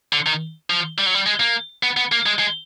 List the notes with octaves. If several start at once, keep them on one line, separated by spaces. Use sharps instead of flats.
D3
D#3
F3
G3
F#3
G3
G#3
A#3
B3
B3
A#3
G#3
G#3